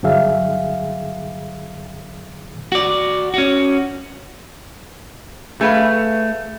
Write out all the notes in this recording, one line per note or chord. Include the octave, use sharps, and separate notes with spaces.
G2 D3 F#3 G#4 E5 F5
F#4 D5
C#4 F#4
A3 G#4 B4 F5